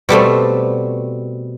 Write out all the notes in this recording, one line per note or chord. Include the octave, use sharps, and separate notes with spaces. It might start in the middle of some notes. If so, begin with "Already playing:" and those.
B2 G3 A3 C4